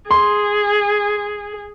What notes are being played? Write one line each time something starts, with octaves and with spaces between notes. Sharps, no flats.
G#4 C6